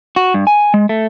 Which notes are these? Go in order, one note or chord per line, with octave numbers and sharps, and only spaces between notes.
F#4
G2
G#5
G#3
A3